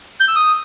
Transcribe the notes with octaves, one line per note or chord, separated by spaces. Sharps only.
G6
E6
D#6